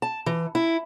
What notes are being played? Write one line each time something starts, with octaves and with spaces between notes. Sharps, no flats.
A5
E3
E4